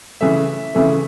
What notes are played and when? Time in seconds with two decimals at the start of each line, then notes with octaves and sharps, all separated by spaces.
0.21 C#3 E3 A3 E5
0.74 C#3 E3 A3